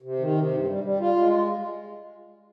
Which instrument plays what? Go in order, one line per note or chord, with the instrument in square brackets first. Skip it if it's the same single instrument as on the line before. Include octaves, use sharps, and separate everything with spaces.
[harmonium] C3
D#3
C3
G2
G3
G3
F4
G#3